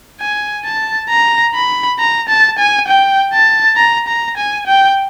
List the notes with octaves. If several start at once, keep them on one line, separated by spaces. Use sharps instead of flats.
G#5
A5
A#5
B5
A#5
A5
G#5
G5
A5
A#5
A#5
G#5
G5